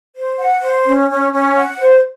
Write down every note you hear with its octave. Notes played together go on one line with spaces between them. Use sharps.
C5
F#5
C5
C#4
C#4
C#4
F#5
C5